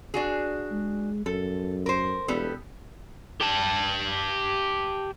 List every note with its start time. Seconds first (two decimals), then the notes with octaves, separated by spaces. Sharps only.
0.14 D4 F#4 G#4
0.72 G#3
1.26 F#2 A4
1.86 A#4 C5
2.28 E1 G3 B3 A4
3.41 G4 A5